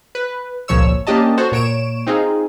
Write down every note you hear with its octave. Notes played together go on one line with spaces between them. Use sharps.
B4
G#1 C#2 A#2 F3 C#5 E6
A#3 C#4 D4 G4 D#5 A5
F#4 A4 C5 C#5
A#2 C#5 D7 E7
C4 D#4 F4 G#4